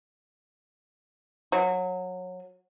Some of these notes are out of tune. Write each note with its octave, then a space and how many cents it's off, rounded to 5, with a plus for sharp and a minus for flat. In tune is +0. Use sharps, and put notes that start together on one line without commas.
F#3 -20